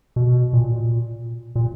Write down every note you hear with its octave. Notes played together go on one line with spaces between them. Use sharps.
B2
A#2
A#2